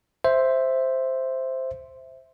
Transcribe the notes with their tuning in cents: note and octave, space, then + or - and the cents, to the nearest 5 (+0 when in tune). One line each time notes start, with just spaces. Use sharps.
C5 +0 E5 +0